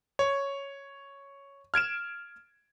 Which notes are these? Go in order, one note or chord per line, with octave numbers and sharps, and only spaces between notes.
C#5
F6 G#6 D7 E7